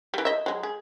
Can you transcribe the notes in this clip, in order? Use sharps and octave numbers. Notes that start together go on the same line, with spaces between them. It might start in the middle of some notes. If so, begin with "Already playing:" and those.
E3 G3
D#5 E5
F#3 G#3
G#4